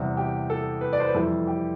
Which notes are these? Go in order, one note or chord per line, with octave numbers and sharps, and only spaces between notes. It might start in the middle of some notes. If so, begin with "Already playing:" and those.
Already playing: E2 C3 G3
G4
A4
B4
D5
C5
B4
F2 E3 G3 A4
G4